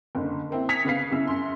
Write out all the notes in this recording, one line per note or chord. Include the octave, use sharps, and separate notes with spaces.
F#1 D3
A#3 C4 E4
D#6 G#6 A#6 B6 C#7 F7
C#3 B3 B4 F5 C7
F#2 C#3 E4 E6
F#2 C6